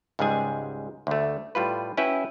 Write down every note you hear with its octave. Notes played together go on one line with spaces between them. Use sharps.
C#2 G#2 G3 G#3 G#4 G#5
D2 A3
A2 G3 F4 B4
C#4 E4 F#4 B4 E5 G5